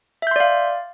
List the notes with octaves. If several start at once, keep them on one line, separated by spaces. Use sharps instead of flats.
D5 E5 F5 C6 G6